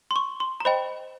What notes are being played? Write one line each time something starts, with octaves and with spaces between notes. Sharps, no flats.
C6
C#6
C6
A#5
C5 D#5 G5 B5